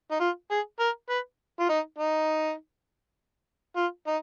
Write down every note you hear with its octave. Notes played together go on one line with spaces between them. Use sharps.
D#4
F4
G#4
A#4
B4
F4
D#4
D#4
F4
D#4